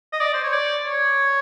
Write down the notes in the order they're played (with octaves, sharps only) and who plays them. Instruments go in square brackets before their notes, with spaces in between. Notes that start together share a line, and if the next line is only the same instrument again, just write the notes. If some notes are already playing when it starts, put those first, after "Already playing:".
[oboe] D#5
D5
C5
C#5
D5
C#5